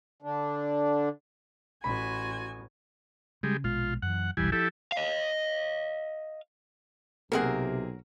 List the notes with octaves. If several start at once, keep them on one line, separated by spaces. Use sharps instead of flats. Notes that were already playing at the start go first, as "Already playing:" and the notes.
D3 D4
A1 F#4 G#5 B5
C#3 G3 G#3
A#1 B2 G#3 F4
F#2 E3 F#5
F1 B1 E3 G3 G#5
F3 E4 G4 A4
D#5 F5
B1 C3 F#3 A#3 C4 G#4 A#4 F#5